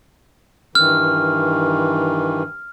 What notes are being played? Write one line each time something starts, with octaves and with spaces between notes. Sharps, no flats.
G2 D#3 E3 F6